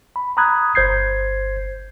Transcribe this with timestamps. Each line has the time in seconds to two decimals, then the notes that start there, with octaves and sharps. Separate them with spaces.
0.16 B5
0.37 A#5 B5 D#6 F#6 G#6
0.75 G1 C5 G6 G#6 C7